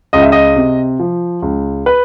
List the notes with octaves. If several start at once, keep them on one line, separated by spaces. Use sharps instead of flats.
C#2 D#5
E5
D#5
C3
F3
C#2
B4